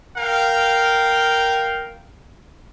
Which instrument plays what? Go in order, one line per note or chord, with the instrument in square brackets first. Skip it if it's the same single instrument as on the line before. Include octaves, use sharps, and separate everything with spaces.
[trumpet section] A#4 F5 G5